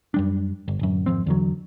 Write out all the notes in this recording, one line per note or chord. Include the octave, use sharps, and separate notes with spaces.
F#2 G3 D4
G1
D1 F#2
G#1 F2 C4
E2 D3 F#3